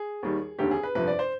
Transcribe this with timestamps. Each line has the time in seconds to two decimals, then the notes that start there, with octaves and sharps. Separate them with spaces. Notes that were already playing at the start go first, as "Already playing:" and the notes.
Already playing: G#4
0.23 D#2 D#3 G3
0.59 F1 D#2 D3 G4
0.71 G#4
0.83 B4
0.95 G1 F2 C3 F3 B4
1.07 D5
1.19 C5